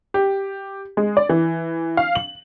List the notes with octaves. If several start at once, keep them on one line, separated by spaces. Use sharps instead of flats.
G4
G#3
D5
E3
F5
F#7